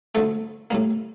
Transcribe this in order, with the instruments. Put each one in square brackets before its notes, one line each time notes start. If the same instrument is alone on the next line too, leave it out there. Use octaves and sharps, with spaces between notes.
[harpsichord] D2 D3 F3 A3 A4
A2 G3 A#3